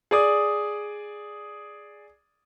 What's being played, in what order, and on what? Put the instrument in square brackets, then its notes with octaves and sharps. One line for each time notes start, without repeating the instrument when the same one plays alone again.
[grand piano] G#4 D5 D#6